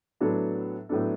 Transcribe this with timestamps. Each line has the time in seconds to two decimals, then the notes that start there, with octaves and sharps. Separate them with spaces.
0.21 A2 F#3 B3 D4 A4
0.89 A2 F#3 B3 D4 A4